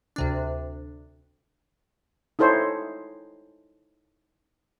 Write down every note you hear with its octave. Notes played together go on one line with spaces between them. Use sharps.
D2 C3 D4
D#4 E4 A4 C5 C#5